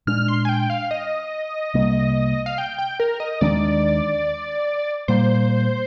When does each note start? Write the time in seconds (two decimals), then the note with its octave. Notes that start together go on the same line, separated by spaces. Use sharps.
0.07 A#2 G#3 D4 F6
0.28 C6
0.45 G#5
0.49 G5
0.70 F5
0.91 D#5
1.74 C2 C3 G3 A#3
2.46 F5
2.58 G5
2.78 G5
3.00 A#4
3.20 D#5
3.41 D#2 D#3 G#3 D4 D5
5.08 A#2 G3 A#3 C5